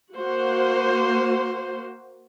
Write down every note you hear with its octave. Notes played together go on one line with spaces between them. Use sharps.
A#3 F#4 C5